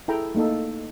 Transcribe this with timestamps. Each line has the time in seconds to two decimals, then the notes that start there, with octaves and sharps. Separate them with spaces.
0.08 E4 G#4 A4 G5 A#5 B5
0.35 A3 A#3 D#4 A4 D#5